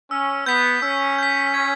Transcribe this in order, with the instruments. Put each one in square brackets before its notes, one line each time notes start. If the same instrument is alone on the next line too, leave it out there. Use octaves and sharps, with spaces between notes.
[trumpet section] C#4 [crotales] E6
[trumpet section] B3 [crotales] G6 B6
[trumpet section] C#4 [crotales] E6
[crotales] G6 B6
G#6